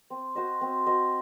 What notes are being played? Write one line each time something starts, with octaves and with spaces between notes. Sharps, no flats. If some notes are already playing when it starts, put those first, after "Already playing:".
C4
F#4 C5 D#5
C4
F#4 C5 D#5